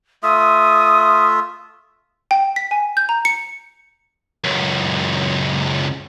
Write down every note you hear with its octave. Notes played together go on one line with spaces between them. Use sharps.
A3 F4 E5 D#6
G5
B6
G#5
G6
A#5
C#7
C#2 F#2